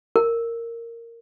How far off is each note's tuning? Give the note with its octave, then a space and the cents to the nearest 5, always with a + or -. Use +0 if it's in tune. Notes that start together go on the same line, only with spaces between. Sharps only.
A#4 -10